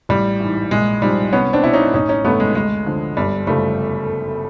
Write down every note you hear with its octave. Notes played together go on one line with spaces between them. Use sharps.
A1 G3
G#2 E3
A#1 G#3
G#2 F3 G3
C2 B3 C#4
C4 D4
B2 E4
C#4 D#4
A1 C#4 D#4
C#4 D#4
G2 D#3 A3 B3
G#3
D2 G#3
D3 F3
G1 G3
F#2 C#3 F3 G3 A3